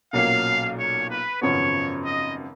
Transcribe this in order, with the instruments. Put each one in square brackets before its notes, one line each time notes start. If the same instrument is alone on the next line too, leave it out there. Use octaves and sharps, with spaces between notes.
[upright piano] B1 A#2 F#3 A#3 C#4 [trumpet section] F5
[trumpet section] C#5
B4
[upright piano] G#1 F#2 C#3 F3 B3 [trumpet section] C#5
[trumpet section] D#5